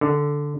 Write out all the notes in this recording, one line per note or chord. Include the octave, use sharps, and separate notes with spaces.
D3